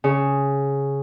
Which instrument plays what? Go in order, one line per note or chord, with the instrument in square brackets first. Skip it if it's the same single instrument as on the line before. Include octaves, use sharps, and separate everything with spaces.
[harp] C#3